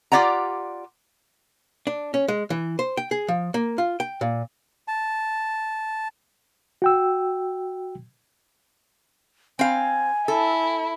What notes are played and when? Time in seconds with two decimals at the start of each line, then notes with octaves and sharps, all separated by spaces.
0.12 F4 G4 D5 F#5 A#5
1.87 D4
2.14 C#4
2.28 G#3
2.50 E3
2.79 C5
2.97 G5
3.11 G#4
3.28 F3
3.54 A#3
3.78 F4
4.00 G5
4.21 A#2
4.88 A5
6.82 F#4 G5 E6
9.59 C4 F5 G#5
10.28 E4 A4